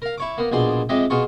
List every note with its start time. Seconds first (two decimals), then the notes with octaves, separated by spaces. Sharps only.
0.02 A#4 F5
0.18 E4 C#5 D6
0.38 A#3 B3
0.52 A#1 B2 G#4 D5 C6
0.89 F2 G#3 G4 D#5 E5
1.10 B2 F4 G#4 C#6